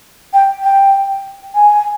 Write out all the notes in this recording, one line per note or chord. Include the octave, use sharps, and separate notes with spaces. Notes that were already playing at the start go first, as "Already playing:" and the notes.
G5
G5
G#5